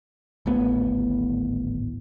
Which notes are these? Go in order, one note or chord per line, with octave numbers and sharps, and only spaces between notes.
D1 G#1 A2 B3